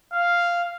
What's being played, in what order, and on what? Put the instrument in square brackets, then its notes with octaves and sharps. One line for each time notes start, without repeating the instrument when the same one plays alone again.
[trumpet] F5